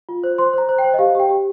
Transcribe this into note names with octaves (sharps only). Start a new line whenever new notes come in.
F4
C5
C5 C6
C5 A#5
C5
G5
C5
D#5
G4 F5
G4 G5
G4